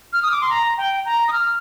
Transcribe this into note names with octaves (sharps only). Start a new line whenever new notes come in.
F6
D#6
D6
C6
A#5
G5
A#5
D#6
F6